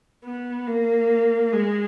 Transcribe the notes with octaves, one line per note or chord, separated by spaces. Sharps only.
B3
A#3
G#3